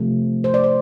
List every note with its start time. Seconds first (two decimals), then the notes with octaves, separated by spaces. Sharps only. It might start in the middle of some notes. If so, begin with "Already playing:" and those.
Already playing: C3 F3 A3
0.44 C5
0.54 D5
0.64 C5